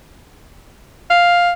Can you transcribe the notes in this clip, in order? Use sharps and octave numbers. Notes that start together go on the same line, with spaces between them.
F5